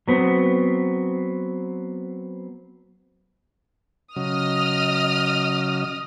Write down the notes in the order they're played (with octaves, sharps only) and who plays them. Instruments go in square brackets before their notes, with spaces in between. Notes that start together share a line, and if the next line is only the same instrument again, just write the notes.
[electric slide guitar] F#3 B3 C4
[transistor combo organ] C#3 F#3 [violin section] D#5 D#6 F6